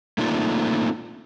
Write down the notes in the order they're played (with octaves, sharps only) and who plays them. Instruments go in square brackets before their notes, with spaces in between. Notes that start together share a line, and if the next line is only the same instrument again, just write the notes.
[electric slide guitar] A3 A#3 C4 D4 D#4 F4